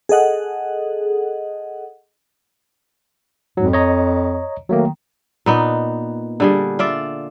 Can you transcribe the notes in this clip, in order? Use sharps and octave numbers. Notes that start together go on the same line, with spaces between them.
G#4 A4 D#5 F#5
F2 G#2 F#3
C#5 D#5 A#5
D#3 F#3 A3 A#3
A#2 B3 D#4
D3 G3 G#4
F4 D5 E5